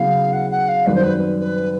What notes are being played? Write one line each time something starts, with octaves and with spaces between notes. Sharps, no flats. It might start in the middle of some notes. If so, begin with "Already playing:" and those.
Already playing: C#3 F#3 B3 E4 F5
F#5
F#5
F5
F#2 D#3 G3 C4 B4
C5
B4
B4